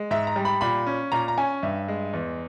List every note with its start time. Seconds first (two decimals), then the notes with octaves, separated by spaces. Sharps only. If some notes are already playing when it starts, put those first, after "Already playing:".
Already playing: G#3
0.11 G#2 E5
0.27 A#5
0.36 G3
0.45 B5
0.61 A#2 B5
0.87 C#4
1.12 A#2 A#5
1.28 A#5
1.38 C#4 G#5
1.63 G2 E5
1.88 G#3
2.13 E2